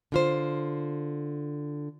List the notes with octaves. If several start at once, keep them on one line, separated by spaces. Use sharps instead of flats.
D3 F4 C5